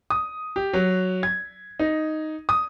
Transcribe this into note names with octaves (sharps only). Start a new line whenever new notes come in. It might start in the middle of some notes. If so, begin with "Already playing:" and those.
D#6
G4
F#3
G#6
D#4
D#6